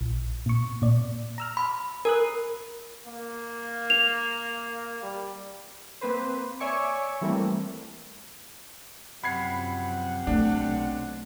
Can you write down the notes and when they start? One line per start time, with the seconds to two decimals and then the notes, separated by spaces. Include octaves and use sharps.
0.01 A#1
0.46 A#2 C#6
0.82 A#2 D5
1.38 A#5 E6 F6
1.57 B5
2.05 A#4 G#5 D#6 F#6
3.07 A#3
3.90 F7
5.02 G3
6.01 A#3 C4 B4 C5
6.60 C#5 D5 E5 G#5 C#6 D6
7.21 E3 G3 A3 A#3 C4 E4
9.24 F#2 C3 F3 F#5 B5 G#6 C7
10.27 B1 A3 D4